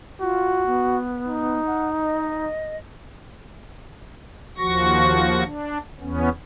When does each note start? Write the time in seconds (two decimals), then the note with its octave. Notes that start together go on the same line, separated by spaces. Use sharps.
0.21 F4 F#4
0.66 B3
1.27 D#4
1.66 F#5
2.03 D#5
4.58 D#2 F3 F#4 C#6 A#6
5.45 D4
6.00 E2 B3 C#4